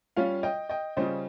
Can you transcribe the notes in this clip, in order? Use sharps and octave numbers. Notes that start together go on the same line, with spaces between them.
G3 C#4 F4 C#5 F5
D#5 G5
D#5 G5
C#3 G3 C#4 F4 C5 D#5